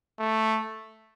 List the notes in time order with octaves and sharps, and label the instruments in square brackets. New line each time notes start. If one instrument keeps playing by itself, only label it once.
[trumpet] A3